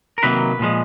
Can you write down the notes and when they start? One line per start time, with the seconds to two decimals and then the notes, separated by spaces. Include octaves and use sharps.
0.18 A#4
0.23 C3 D#3 F#3 A#3 B4
0.59 A#2 F3 G#3